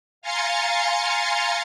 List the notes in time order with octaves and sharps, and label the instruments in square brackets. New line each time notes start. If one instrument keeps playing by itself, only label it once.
[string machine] F5 G#5 A#5 C6 A6 C#7